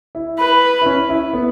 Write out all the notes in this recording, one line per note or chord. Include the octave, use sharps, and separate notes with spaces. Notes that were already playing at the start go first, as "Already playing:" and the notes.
E4
B4
E4
C#4
E4
B3